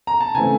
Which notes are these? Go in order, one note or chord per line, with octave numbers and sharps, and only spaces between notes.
A#5
A5
C#3 E3 A3 C4 G#5